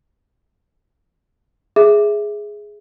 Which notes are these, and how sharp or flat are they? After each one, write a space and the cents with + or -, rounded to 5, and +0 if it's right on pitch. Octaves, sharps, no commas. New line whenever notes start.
G#4 +0 E5 +0